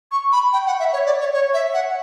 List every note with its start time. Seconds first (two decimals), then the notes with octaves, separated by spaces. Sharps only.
0.11 C#6
0.32 B5
0.53 G5
0.66 F#5
0.79 E5
0.93 C#5
1.06 D5
1.19 C#5
1.33 C#5
1.53 E5
1.73 F#5